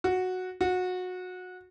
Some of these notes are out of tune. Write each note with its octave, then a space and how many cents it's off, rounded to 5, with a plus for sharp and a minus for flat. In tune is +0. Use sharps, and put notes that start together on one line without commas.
F#4 -5
F#4 -20